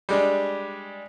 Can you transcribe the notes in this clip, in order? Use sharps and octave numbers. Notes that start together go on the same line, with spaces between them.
G3 G#3 D4